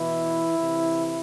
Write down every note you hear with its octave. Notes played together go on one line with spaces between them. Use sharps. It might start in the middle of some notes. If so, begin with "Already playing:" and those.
Already playing: B2 E3 E4
C3 E3